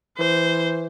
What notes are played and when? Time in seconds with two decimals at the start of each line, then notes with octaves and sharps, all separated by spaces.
0.18 E3 C5